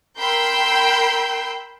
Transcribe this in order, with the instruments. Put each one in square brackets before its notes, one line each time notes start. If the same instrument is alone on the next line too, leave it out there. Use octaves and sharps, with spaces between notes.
[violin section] A#4 G5 B5 C6 E6 G6